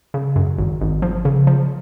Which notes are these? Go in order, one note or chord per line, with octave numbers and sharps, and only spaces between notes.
C#3
F#2
G#1
G#1
F3
C#3
F3